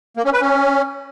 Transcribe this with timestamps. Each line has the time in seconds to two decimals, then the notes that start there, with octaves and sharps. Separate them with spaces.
0.17 A#3
0.25 C#4
0.33 B4
0.41 C#4